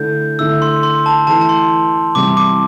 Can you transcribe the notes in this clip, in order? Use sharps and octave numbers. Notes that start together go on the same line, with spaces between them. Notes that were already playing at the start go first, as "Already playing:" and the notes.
Already playing: D3 A3 E4 A4 G6
D3 A3 E4 E6
C6
C6
A5
E3 A3 E4 A5
A5
C6
C3 E3 G3 E4 D6
D6